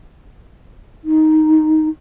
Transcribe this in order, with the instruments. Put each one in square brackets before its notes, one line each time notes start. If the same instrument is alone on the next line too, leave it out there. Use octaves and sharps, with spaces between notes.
[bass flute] D#4